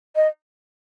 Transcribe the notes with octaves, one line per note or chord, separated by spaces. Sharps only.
D#5